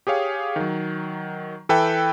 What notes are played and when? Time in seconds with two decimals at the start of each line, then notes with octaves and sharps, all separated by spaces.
0.07 G4 G#4 C#5 F5
0.56 D#3 F#3
1.69 E3 A4 B4 E5 G5